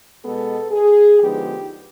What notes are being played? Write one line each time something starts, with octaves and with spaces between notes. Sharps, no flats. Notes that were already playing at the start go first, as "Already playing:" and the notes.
B2 G#3 B3 A4
G#4
D3 F3 G#3 B3 D#4 G4